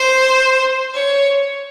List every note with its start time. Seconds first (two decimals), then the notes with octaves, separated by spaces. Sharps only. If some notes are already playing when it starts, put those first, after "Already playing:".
Already playing: C5
0.93 C#5